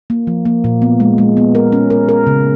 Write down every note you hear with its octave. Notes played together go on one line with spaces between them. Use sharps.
A#3
F3
A#3
A#2
B3
G#3
G#3
B3
A#4
C#4
A#4
A#4
C#3